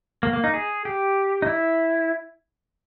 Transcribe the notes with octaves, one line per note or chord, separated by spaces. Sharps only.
A#3
A#3
D#4
G#4
G4
D#4
E4